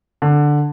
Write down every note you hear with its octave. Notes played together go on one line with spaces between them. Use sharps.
D3